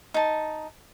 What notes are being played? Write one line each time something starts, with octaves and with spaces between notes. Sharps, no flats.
D#4 A5